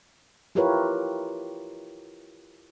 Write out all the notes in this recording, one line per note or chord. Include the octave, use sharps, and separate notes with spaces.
E4 F4 G4 A#4 B4 C#5